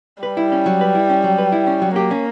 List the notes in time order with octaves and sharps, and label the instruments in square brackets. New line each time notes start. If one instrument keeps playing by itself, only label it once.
[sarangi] G3 [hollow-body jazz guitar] B4
[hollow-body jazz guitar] E4
C#4
F#3
B4
E4
C#4
F#3
B4
E4
C#4
F#3
[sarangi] A#3 [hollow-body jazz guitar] G4
[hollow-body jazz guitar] C#4